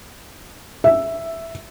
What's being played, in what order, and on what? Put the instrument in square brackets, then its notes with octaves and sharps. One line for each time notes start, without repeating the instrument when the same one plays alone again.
[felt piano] E5